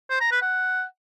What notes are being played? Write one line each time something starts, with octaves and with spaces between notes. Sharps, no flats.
C5
A#5
B4
F#5